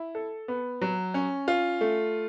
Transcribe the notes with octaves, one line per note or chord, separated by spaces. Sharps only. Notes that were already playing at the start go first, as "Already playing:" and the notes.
Already playing: E4
A4
B3
F#3
C#4
F4
A3